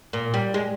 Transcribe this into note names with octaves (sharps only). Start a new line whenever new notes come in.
A#2
G3
G#3